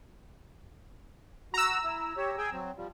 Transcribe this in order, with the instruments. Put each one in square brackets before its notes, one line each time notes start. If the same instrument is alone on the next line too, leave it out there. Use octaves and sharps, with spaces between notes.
[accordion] F#4 [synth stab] A#5 E6
[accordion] E4
G4 C#5
G#4 G5 G#5
F#3 C4
F3 G3